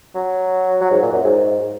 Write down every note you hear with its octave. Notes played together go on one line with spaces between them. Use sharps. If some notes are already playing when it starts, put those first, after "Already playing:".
F#3
F#3
G#2
A#2
F#2
G#2